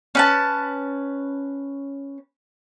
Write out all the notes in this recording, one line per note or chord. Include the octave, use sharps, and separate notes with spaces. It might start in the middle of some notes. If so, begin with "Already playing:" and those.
C#4 B4 A5